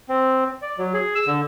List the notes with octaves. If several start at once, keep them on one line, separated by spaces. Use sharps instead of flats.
C4
D5
F#3
G#4
E6
D3